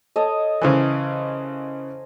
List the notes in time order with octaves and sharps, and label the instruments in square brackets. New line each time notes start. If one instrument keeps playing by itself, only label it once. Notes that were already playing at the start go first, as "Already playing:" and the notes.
[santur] A4 C#5 D#5
[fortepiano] C#3 E3 [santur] A#4 C5 G#5